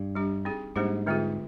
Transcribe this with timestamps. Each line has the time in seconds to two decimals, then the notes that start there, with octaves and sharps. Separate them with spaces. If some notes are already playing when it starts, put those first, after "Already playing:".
Already playing: G2
0.15 G3 D4 G4
0.45 C4 D#4 G#4
0.76 G#2 G3 A#3 D4 G4 C5
1.06 D3 G#3 C4 F4 G#4